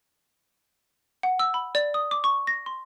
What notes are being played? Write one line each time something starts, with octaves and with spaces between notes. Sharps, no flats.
F#5
E6
B5
D5
D#6
D6
C#6
A#6
C6